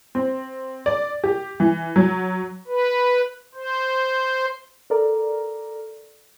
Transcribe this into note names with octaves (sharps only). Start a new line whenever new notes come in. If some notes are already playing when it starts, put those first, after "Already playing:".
C4
D5
G4
E3
F#3
B4
C5
A4 A#4 D5 A#5